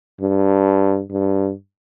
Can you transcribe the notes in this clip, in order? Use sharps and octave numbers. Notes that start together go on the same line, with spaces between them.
G2
G2